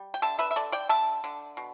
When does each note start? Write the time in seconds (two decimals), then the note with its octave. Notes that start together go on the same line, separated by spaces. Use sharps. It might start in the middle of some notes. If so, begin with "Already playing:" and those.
Already playing: G3
0.14 G5
0.22 D3 E5 A5
0.39 B4 E5
0.51 E5
0.56 D3 A4 D5
0.72 D5 G5
0.89 D3 E5 A5
1.24 D3
1.57 B2